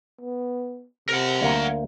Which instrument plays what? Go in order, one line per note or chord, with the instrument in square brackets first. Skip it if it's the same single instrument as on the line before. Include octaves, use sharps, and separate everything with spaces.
[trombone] B3
[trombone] C3 [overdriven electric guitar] A#4 F#5
[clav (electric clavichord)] D2 A#3